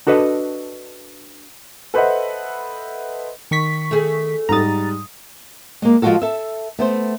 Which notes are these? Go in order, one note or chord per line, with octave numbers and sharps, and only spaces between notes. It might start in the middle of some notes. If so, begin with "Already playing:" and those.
D4 F#4 A4 B4 D#5
A4 B4 C5 D#5 E5 F#5
D#3 C#6 B6
A3 G#4
G#2 G3 A#5 D#6 A6
G#3 A#3
F3 G#3 C4 F4 F#4 A4
A4 E5
A3 B3 C5